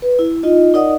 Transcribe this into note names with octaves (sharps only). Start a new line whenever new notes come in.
B4
E4
D#4 F4 D#5
D#4 A#4 D5 D#5 F#5 D#6